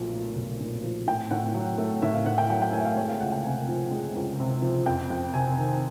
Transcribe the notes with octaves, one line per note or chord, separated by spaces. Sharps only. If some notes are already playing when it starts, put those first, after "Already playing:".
Already playing: B1 A#2 F3 A3
A3
B1
A#2
F3
A2 G5
A2 F#5
F#3
A3
A2 E5
F5
A2 F#5
G5
F#3 G5
G5
A3 G#5
E5
F5
G#3 C#5
F5
C#2 F#5
G5
C3 G#5
F3
G#3
C#2
C3
F3
F2 G5
F2
C3 G#5
D#3